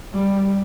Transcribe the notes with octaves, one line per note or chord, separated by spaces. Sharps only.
G3